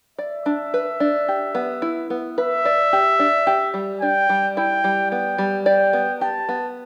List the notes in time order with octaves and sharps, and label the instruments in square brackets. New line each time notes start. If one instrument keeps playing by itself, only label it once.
[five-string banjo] D5 [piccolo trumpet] E5
[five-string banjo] D4
B4
D4
G4
B3
E4
B3
[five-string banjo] B4 [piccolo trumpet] E5
[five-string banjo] D5
G4
D4
G4
G3
[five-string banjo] D4 [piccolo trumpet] G5
[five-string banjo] G3
[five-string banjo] E4 [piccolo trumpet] G5
[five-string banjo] G3
[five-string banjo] B3 [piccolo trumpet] G5
[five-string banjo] G3
[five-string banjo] D5 [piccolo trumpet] G5
[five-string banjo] B3
[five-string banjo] G4 [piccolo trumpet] A5
[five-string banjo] B3